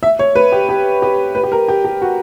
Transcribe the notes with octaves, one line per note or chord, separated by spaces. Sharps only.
E5
C#5
B4
G4
G4
G4
B4
G4
A#4
G4
G4
F#4